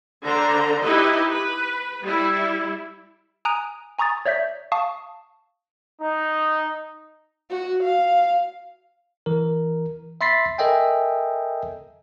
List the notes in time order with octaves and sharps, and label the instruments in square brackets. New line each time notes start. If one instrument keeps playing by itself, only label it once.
[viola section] D3 D4 C5 A#5
D#4 E4 G4 B4 D#5
B4
G3 E4
[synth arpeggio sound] G#5 A#5 D#6 F#6 D7 D#7
G#5 A#5 C#6 D#6 A6
C#5 D5 E5 G6 B6
F5 A5 C#6 D#6
[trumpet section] D#4
[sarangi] F#4
F5
[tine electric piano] E3 A#4
E5 B5 C6 A6 B6 C7
A4 A#4 D#5 E5 G5 G#5